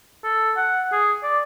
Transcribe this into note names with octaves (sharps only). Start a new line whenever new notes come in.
A4
F#5
G#4
D5